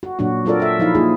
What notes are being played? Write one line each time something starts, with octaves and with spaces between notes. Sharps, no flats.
F#4
A#2 F#3 D4 F#4
F#3 C4 F4 A4 A#4 D5
A4 E5
F3 D#4 E4 F5
A#3 D#4 F4 G#4